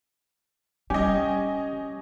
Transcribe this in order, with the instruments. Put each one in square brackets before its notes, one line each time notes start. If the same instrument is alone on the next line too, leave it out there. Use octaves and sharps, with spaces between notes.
[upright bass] G3 [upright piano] C#4 [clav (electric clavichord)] G4 [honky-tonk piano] D#5 G#5